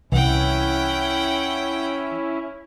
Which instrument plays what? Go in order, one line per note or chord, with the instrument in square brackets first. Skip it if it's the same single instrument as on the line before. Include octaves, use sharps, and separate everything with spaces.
[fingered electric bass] C2 [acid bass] E3 [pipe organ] C#4 E4 [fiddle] F#5 G5